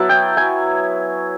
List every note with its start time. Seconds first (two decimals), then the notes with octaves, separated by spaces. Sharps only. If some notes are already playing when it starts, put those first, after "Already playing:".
Already playing: F#3 B3 E4 A5
0.09 G5
0.37 G#5